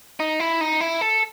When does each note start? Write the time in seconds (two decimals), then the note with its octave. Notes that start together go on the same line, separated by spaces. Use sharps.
0.20 D#4
0.40 E4
0.61 D#4
0.81 E4
1.01 A4